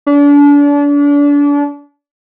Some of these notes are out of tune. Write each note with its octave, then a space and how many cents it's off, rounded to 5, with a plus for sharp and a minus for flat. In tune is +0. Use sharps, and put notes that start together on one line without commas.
D4 -35